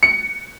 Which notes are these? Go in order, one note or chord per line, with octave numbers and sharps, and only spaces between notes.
C#7